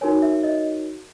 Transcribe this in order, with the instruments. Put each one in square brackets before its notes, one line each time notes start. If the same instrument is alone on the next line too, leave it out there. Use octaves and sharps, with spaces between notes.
[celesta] D#4 F#4 A#4 C#5 G#5
E5
D#5